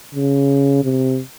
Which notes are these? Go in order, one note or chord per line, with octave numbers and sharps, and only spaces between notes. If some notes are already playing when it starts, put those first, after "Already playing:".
C#3
C3